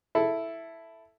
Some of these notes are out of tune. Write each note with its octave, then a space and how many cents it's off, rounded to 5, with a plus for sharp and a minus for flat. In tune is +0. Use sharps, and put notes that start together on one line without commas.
E4 +0 A4 +0